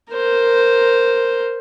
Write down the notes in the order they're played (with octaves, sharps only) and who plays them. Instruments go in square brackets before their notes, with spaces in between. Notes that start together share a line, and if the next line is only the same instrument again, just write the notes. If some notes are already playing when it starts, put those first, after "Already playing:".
[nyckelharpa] A#4 C5